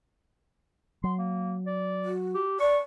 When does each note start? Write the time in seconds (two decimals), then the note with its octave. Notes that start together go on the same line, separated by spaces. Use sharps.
1.04 F#3 C6
1.18 A#3
1.66 D5
2.05 F#4
2.35 G4
2.60 D5 C#6